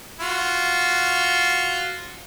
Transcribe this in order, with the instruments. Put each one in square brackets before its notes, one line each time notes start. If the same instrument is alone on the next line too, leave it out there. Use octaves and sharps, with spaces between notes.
[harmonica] F4 F#4